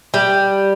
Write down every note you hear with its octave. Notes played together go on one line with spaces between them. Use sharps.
G3